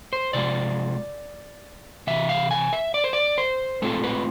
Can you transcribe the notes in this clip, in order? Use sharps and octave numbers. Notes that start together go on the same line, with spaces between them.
C5
C3 F3 G#3 D5
C3 E3 E5
F5
G#5
E5
D5
C5
D5
C5
A2 G#3 C4 F4 A4
B4